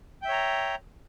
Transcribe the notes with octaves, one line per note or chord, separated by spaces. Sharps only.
C#5 E5 G5 A#5